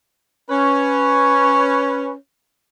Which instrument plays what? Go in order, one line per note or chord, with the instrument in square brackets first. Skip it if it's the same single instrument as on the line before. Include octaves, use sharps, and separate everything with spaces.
[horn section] C#4 B4